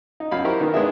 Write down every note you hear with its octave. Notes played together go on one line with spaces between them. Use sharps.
D#4
F#2 F5 B5
E4 G4 A#4 C5 C#6
D#3 B3 A#4
G#3 B3 D4 G#4 E5